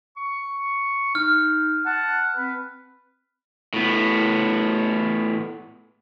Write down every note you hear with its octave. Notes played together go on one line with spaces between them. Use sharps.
C#6
D#4 F6
F#5 A5
C4 B4
A2 B3